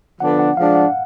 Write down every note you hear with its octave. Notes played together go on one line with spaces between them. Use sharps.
D3 F3 B3 D4 F#5
F#5
F3 G#3 D4 F5
F#5